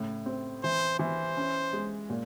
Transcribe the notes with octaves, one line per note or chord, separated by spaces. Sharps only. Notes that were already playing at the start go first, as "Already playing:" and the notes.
Already playing: A2 C#3
C4
E3 C5
E3 C5
C#4
G#3
A#2